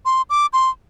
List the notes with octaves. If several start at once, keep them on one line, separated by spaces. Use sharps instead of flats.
C6
D6
C6